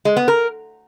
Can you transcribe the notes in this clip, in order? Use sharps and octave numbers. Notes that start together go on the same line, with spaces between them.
G#3
B3
A#4